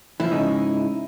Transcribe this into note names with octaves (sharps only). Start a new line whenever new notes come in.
E3 F3 E4
G#2 C#3 D#4